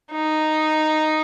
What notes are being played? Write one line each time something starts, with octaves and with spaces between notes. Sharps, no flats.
D#4